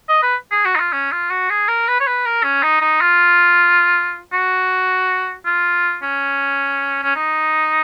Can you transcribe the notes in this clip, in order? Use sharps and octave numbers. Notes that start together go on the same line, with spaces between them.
D#5
B4
G#4
F#4
D#4
F4
C#4
F4
F#4
G#4
A#4
B4
C#5
B4
A#4
C#4
D#4
D#4
F4
F#4
F4
C#4
C#4
D#4